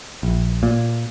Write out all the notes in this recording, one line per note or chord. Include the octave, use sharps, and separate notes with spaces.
A#1
A#2